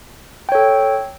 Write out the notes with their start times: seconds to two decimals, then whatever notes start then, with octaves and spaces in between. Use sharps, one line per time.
0.49 G5
0.52 C#5
0.55 A4